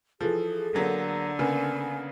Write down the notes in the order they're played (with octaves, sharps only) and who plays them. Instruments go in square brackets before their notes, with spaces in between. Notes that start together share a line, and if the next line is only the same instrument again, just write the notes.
[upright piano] E3 F3 [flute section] G#4 A4
[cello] D3 [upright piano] F#3 A#3 B3
[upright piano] C#3 A#3 B3 [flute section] G#5